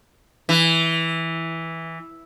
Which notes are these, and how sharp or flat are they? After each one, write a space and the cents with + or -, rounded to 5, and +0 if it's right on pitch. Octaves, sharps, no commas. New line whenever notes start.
E3 -5